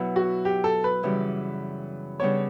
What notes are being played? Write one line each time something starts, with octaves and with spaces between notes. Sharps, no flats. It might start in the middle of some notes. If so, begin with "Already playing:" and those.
Already playing: B2 F#3 B3 E4
F#4
G4
A4
B4
F#2 C#3 E3 G3
C#3 G3 B3 D4 C#5